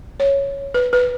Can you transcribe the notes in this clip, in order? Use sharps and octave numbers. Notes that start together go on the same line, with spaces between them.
C#5
B4
B4